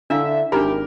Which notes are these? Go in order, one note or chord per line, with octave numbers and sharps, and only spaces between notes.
D3 D4 E4 E5 F5
G#1 D4 D#4 G4 A#4 B5